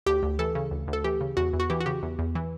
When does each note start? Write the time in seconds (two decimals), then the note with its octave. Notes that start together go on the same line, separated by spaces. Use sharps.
0.06 D2 G4
0.23 D2
0.39 E3 A4
0.55 C#3
0.71 D2
0.88 D2
0.93 A4
1.04 E3 G4
1.21 C#3
1.37 E2 F#4
1.53 E2
1.60 F#4
1.70 E3 G4
1.80 F#4
1.86 C#3 G4
2.02 E2
2.19 E2
2.35 E3